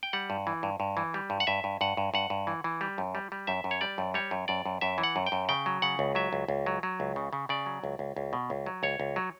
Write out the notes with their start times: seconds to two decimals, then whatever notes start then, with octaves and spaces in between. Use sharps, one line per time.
0.03 G5
0.13 G3 F#5
0.30 G2
0.47 E3
0.63 G2
0.80 G2
0.97 E3
1.14 G3
1.30 G2
1.40 F#5
1.47 G2 E5
1.64 G2
1.81 G2 F#5
1.97 G2
2.14 G2 F#5
2.30 G2
2.47 E3
2.64 E3
2.81 G3
2.98 F#2
3.15 G3
3.32 G3
3.47 F#2 E5
3.64 F#2
3.71 C#5
3.81 G3 D5
3.98 F#2
4.14 G3 C#5
4.31 F#2
4.48 F#2 D5
4.66 F#2
4.81 F#2 E5
4.98 E3
5.04 F#5
5.16 F#2
5.26 G5
5.32 F#2
5.49 C#3 G5
5.66 F#3
5.82 C#3 F#5
5.99 C#2
6.15 F#3 E5
6.33 C#2
6.48 C#2
6.66 F#3
6.83 F#3
7.00 C#2
7.16 C#3
7.33 C#3
7.49 C#3 D5
7.66 F#3
7.84 C#2
7.99 C#2
8.16 C#2
8.33 B2
8.50 C#2
8.66 F#3
8.83 C#2 C#5
9.00 C#2
9.16 F#3